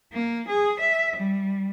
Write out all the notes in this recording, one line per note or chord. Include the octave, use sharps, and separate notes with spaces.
A#3
G#4
E5
G3